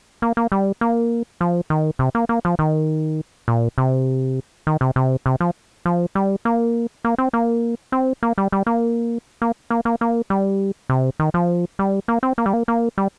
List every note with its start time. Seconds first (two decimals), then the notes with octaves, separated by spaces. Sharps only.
0.22 A#3
0.37 A#3
0.52 G3
0.81 A#3
1.41 F3
1.70 D#3
1.99 C3
2.15 A#3
2.29 A#3
2.45 F3
2.59 D#3
3.48 A#2
3.78 C3
4.67 D#3
4.81 C3
4.96 C3
5.26 C3
5.40 F3
5.85 F3
6.15 G3
6.45 A#3
7.04 A#3
7.18 C4
7.33 A#3
7.92 C4
8.23 A#3
8.38 G3
8.52 G3
8.66 A#3
9.42 A#3
9.70 A#3
9.85 A#3
10.01 A#3
10.30 G3
10.90 C3
11.19 D#3
11.34 F3
11.79 G3
12.08 A#3
12.23 C4
12.38 A#3
12.46 G3
12.53 A#3
12.68 A#3
12.98 G3